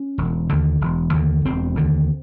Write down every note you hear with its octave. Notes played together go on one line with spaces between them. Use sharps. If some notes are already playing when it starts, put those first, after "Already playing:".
Already playing: C#4
E1
D#2 D3
E1
D#2 D3
E1 C4
D#2 D3